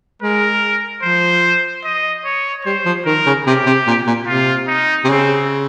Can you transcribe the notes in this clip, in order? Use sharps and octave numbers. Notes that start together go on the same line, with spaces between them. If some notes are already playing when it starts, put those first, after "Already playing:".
G#3 A#4
F3 C5
D#5
C#5
G3 C5
F3
D#3 A#4
C#3
C3 G4
C3
A#2
A#2
C3 F4
D#4
C3
C#3 C4